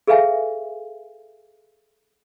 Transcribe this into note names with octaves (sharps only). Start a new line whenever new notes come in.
G#4 A4 B4 E5 F5 G#5